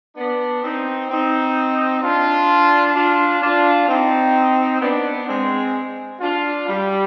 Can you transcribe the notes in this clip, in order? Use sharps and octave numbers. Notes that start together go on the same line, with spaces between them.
B3 D4
C4 D#4
C4 D#4
D4 F4
D4 F4
D4 F4
C4 D#4
B3 D4
G#3 C4
D4 F4
G3